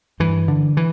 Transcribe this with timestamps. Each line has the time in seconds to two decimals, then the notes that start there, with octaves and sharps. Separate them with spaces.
0.20 G2 E3
0.48 D3
0.77 E3